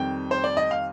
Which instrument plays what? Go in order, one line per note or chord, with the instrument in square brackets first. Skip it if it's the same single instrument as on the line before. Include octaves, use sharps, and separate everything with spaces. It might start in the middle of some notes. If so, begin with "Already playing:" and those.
Already playing: [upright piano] F2 D#3 G3 C4 G5
C5
D5
D#5
F5